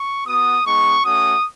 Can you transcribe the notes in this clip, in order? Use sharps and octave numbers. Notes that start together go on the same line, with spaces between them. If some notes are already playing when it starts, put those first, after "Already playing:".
Already playing: C#6
B3 F#4 D#6
G#3 B3 D#4 C#6
A3 C#4 F#4 D#6